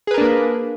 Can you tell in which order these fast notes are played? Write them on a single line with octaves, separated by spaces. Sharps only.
G#4 B4 A#4 D4 A#3